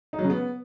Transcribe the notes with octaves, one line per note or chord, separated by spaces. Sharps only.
D#4
F#3
C#3
B3